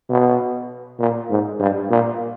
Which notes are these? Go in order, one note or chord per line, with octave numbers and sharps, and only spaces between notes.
B2
A#2
G#2
G2
A#2